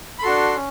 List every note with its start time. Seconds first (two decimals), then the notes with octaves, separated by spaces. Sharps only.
0.19 B5
0.23 D4 F#4 A4 C6
0.55 C#4